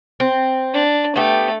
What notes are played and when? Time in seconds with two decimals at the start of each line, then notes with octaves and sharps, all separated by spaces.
0.20 C4
0.74 D4
1.16 A3 B3 G4